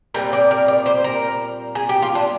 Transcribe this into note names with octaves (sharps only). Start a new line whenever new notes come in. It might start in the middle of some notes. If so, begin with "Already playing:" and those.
A#2 G3 C4 A#4
D5
A#4
D5
C5
A#4
G#4
G4
F4
D4